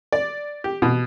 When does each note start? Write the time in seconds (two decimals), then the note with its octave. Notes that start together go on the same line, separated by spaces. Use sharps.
0.12 D5
0.64 G4
0.82 B2